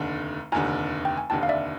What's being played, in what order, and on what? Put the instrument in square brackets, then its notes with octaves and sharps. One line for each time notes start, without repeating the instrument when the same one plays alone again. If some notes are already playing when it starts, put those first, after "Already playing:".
Already playing: [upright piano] F1 D#2 D3
[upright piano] F1 D#2 D3 [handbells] G#5 A#5
[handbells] G5
G#5
[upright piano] F1 D#2 D3 [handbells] G5 A5
[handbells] F5
D5 E5